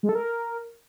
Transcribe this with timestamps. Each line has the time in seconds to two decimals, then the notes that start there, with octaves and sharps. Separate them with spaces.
0.03 G#3
0.09 A4
0.15 A#4